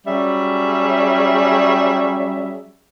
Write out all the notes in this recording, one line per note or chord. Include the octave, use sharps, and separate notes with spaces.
F#3 G3 C#4 G#4 E5